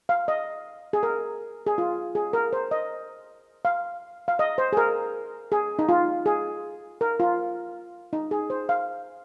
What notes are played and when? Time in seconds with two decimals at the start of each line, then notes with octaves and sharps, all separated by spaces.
0.09 F5
0.28 D#5
0.93 G#4
1.03 A#4
1.66 G#4
1.78 F4
2.15 G#4
2.33 A#4
2.53 C5
2.71 D#5
3.65 F5
4.28 F5
4.39 D#5
4.58 C5
4.73 G#4
4.77 A#4
5.52 G#4
5.79 D#4
5.89 F4
6.26 G#4
7.01 A#4
7.20 F4
8.13 D#4
8.31 G#4
8.50 C5
8.69 F5